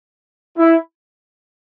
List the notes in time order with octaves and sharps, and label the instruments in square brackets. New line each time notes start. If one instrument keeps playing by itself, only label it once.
[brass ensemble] E4